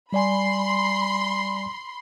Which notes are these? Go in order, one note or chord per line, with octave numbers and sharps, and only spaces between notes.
G3 D5 G#5 B5 C6